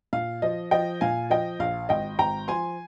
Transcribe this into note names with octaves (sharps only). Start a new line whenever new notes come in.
A#2 F5
F3 D#5
F3 D#5 G5
A#2 F5 G#5
F3 D#5 G5
A#1 F5
G#1 D#5 G5
G#1 G5 A#5
F3 G#5 C6